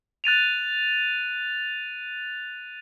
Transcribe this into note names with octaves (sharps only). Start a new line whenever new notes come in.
F#6 A6 D#7 F7